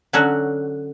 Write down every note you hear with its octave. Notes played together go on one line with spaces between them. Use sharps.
D3 F#3 C#4 F#4